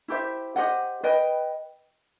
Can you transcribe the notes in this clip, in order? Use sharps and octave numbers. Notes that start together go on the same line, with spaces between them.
E4 G4 C5 E5
G4 C5 D#5 F#5
B4 D#5 G5